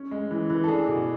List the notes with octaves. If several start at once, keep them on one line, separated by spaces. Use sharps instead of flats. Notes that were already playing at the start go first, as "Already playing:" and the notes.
Already playing: C#4
G#3
E3
E3
A4
D4 G#4
B2